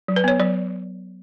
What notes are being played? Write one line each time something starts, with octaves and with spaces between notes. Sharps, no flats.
F#3
B4
B3 C#5
F#3 D5